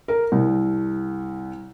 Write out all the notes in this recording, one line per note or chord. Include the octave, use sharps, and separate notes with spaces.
A#4
C2